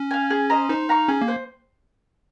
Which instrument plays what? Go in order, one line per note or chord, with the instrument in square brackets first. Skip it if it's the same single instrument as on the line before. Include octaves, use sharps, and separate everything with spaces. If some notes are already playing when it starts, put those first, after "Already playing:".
Already playing: [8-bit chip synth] C#4
[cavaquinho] F5 G#5
G#4
C5 D#5 A#5
[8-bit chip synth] D#4 [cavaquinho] C5
[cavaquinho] F5 A#5 C#6
[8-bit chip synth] C#4 [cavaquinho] G#4
[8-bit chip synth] A#3
[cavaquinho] C5